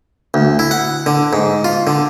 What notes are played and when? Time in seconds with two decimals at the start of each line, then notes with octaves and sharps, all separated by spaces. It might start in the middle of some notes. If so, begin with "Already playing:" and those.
0.34 D2
0.59 E4
0.71 F#5
1.06 D3
1.33 G#2
1.64 F4
1.87 D3